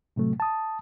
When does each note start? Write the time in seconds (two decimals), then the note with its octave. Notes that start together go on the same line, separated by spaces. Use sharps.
0.16 A2 C3 F#3 A3
0.40 A5 D#6